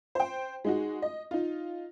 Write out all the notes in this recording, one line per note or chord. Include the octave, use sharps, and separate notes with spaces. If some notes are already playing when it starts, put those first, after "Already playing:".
C5 G5
G#3 D#4 F#4
D#5
D#4 F4